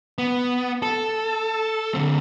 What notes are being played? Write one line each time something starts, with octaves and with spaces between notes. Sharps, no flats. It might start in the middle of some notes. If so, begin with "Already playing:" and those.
B3
A4
D3 C4